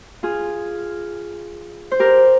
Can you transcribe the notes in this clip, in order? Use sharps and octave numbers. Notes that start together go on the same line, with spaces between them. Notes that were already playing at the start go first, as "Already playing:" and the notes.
F4 G#4
C5
G4 A#4